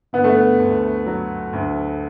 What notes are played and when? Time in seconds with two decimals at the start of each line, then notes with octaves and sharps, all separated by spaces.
0.13 D3 B3
0.24 A3
0.35 B3
0.59 D2
1.06 F#3
1.53 D2